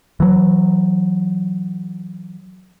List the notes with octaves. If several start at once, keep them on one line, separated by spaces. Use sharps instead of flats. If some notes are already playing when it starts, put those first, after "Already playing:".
E3 F#3